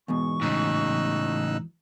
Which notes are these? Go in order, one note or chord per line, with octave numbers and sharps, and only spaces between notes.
E2 G#2 B2 C#6
A2 C#3 D#4 E6 F#6